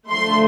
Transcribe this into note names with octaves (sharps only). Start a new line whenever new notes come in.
D3 F3 A3 C6